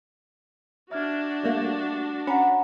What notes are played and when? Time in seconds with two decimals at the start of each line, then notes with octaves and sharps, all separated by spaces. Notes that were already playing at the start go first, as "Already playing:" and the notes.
0.91 D4 F#4 E5 F6 G#6
1.43 G3 A3 A#3
2.27 C#4 F#5 A#5 B5